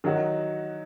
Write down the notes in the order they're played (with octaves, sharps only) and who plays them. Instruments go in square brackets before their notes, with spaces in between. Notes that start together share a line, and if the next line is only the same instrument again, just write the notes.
[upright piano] D#3 F#3 D#4 F#4